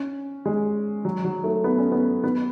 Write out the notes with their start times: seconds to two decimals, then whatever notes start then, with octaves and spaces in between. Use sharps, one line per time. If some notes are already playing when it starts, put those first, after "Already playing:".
Already playing: C#4
0.46 G#3
1.05 F#3
1.24 F#3
1.44 A3
1.64 B3
1.78 C#4
1.92 B3
2.24 B3